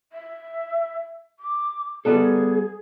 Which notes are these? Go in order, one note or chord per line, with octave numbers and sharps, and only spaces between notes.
E5
D6
G3 B3 G#4 A4